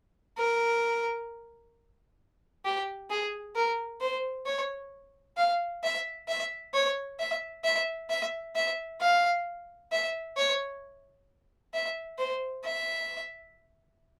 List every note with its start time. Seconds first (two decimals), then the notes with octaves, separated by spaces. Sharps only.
0.37 A#4
2.65 G4
3.10 G#4
3.55 A#4
4.01 C5
4.46 C#5
5.37 F5
5.83 E5
6.28 E5
6.74 C#5
7.19 E5
7.64 E5
8.10 E5
8.55 E5
9.00 F5
9.92 E5
10.37 C#5
11.74 E5
12.18 C5
12.64 E5